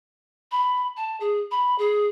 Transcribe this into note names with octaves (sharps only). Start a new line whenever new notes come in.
B5
A5
G#4
B5
G#4